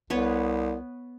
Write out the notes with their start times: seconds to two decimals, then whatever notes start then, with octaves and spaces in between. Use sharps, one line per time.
0.10 C2 B3 B4 C#5